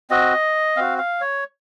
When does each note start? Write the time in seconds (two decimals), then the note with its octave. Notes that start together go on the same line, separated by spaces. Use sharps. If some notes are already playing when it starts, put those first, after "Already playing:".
0.10 C4 F#4 D#5
0.76 C4 F#4 F5
0.98 F5
1.21 C#5